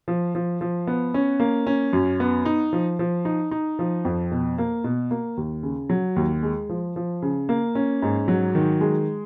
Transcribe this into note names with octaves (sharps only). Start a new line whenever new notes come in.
F3
F3
F3
B3
C#4
A#3
C#4
F#2
B3
D#4
F3
F3
D#4
D#4
F3
F2
B2
A#3
B2
A#3
D#2
C#3
F#3
D#2
G#3
F3
F3
C#3
A#3
C#4
G#2
F#3
D#3
G#3